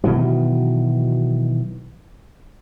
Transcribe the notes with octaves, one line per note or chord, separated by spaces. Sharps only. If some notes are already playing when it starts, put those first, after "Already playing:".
B2 D#3 E3 F#3